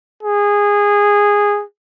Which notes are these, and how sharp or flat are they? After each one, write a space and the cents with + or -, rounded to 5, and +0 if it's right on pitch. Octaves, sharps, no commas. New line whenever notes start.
G#4 -15